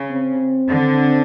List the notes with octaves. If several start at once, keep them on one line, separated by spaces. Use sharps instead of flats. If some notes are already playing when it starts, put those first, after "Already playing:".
Already playing: C#3
C4
D3